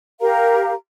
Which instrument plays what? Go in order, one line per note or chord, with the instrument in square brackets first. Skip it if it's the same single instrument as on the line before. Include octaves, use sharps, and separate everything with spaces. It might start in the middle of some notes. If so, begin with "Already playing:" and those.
[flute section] G4 A#4 F5 A#5